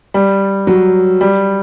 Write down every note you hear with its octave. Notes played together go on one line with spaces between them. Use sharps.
G3
F#3
G3